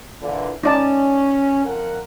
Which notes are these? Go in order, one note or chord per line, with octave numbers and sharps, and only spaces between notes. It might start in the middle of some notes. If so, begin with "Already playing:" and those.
A#2 D3 E3
C#4 D#4 D5 A5
F2 A#4 F#5